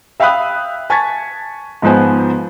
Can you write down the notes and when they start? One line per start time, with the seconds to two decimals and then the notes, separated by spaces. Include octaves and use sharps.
0.20 E5 F5 G5 B5 D#6 F#6
0.90 G#5 A5 C#6 G#6 A6 B6
1.82 G#2 F3 B3 C5 G#5